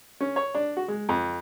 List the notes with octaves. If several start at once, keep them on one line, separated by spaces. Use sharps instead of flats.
C#4
C#5
D4
F#4
G#3
F2